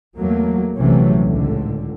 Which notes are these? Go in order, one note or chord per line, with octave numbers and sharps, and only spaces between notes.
E2 F#3 A3 A#3
A#1 C3 E3 F#3 A3 C#4
C#2 A2 D3